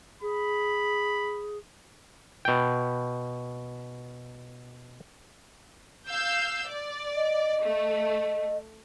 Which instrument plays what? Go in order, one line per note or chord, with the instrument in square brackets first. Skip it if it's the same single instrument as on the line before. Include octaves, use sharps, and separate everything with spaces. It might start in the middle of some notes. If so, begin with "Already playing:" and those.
[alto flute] G#4 [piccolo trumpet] B5
[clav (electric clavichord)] B2 G5
[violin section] F5 E6 G6
D5
[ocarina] D#5
[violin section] A3